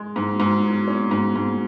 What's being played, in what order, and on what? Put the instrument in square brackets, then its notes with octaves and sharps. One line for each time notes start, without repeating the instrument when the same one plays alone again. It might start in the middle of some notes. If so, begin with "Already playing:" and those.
Already playing: [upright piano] G#3
[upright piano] G#2 [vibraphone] D#4
[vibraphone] F#4
[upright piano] G#2
[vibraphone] D#4
[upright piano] F#3
[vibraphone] B3
A#3
[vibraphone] B3 [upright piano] C#4
[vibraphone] B3
[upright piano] G#2
G#2
[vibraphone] B3